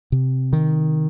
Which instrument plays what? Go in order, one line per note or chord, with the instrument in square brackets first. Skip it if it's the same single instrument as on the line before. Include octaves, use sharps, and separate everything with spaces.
[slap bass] C3
D#3